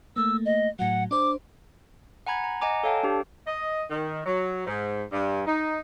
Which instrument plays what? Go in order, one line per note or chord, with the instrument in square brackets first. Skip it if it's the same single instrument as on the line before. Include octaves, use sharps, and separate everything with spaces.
[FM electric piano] A3 A#3 [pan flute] E6
[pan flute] D#5
[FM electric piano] A2 F#3 [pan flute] F#5
[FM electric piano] D4 C5 [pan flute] D6
[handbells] F#5 G#5 A#5 B5 G#6
A#5
D#5 F#5 G#5 A#5 D6
A4 C#5 F5 G5 A5
D4 G4
[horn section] D#5
D#3
F#3
G#2
G2
D#4